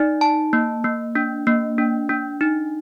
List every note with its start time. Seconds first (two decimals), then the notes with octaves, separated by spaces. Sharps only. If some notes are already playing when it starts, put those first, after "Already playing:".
Already playing: D#4 D5
0.21 A5
0.53 A#3
0.84 A#3
1.15 D4
1.47 A#3
1.78 D4
2.09 D4
2.41 D#4